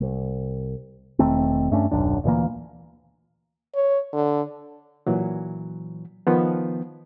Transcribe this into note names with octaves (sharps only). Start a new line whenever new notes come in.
C2
E1 D#3 A3 C4
G2 A3 C#4 D4
D#1 B1 F#2 D4
D2 A#2 E3 A#3
C#5
D3
A#2 E3 F#3
D#3 F3 B3